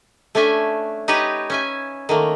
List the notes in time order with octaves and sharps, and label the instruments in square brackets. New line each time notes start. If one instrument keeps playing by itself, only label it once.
[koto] A3 C#4 D4 E5 G#5
D#4 G4 B4 C#5 D#5
C#4 E5 G#5
D#3 A3 A#3